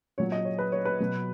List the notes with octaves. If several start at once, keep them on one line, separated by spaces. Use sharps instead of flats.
A#2 F#3 C#5
D#5
C#5
B4
C#5
B4
B2 F#3